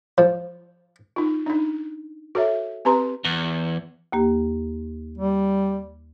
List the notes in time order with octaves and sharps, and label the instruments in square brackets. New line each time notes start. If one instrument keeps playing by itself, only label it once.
[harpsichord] F3
[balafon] D#4 F4
D4 D#4
F#4 A4 C#5 E5
C4 G4 B4 A#5 C6
[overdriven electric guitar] E2
[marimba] D#2 A#3 G4
[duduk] G3